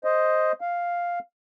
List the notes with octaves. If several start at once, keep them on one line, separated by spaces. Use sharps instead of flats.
C5 D#5
F5